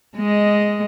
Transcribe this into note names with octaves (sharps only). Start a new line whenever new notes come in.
G#3 D#5